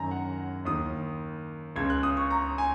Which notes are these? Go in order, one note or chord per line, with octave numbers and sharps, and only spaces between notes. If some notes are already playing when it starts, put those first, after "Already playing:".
Already playing: F#2 D#3 G#5 A#5
F#5
D#2 D#3 D#6
C#2 C#3 G#6
F#6
D#6
C#6
A#5
G#5